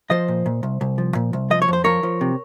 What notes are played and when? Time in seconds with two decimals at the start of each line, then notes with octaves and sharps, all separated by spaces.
0.10 F3 C5 D#5
0.28 A#2
0.46 A#2
0.63 C2
0.81 C2
0.98 F3
1.15 A#2
1.33 C2
1.50 F3 D#5
1.62 C#5
1.68 F2 C5
1.84 F3 A#4 C#5
2.03 F3
2.21 C3